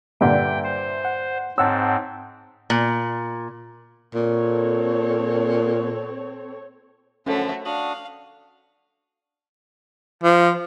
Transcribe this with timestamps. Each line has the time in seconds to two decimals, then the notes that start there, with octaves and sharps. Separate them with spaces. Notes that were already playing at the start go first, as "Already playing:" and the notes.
0.21 G2 A#2 D3 E5 G5
0.64 C5
1.05 F#5
1.58 G#2 C4 C#5 F#5 A5 E6
2.70 A#2
4.14 A#2 C4 A4 C#5
7.26 F#2 D3 F3 A3 C#4 F#4 A4 C#5
7.66 D4 F#4 F5 D#6 F#7
10.23 F3